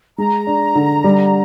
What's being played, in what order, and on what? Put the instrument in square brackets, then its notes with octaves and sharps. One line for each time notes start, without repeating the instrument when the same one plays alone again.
[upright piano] G#3 [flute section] A#5
[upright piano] D4
D3
G3